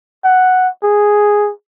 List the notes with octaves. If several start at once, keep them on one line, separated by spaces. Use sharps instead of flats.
F#5
G#4